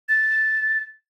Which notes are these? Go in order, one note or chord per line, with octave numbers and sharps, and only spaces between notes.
A6